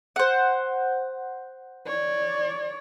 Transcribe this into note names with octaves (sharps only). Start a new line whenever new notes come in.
C5 F#5
C#5 D5